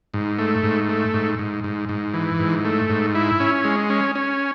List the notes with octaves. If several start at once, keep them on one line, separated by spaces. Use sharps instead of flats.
G#2
A3
G#2
A3
G#2
G#2
G#2
G#2
E3
G#2
A3
G#2
E4
C#4
G#3
C#4
C#4